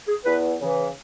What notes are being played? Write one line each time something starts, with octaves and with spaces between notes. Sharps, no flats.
G#4
E2 B4
C#3 E3